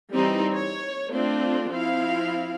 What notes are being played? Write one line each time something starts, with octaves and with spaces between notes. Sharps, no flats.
E3 G3 C4 D#4
C#5
A3 C4 D4 F4
F3 C4 E4 F5